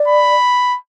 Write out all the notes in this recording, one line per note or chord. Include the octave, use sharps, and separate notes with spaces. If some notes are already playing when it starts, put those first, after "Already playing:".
Already playing: D5
B5